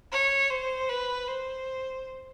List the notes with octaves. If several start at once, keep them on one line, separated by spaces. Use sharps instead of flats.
C#5
C5
B4
C5